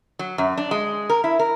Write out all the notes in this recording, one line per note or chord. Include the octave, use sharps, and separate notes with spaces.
F#3
F#2
D4
G#3
A#4
E4
A#4